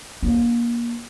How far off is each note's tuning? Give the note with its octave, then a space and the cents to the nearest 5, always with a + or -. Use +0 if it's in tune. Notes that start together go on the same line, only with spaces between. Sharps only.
A#3 +25 D4 +0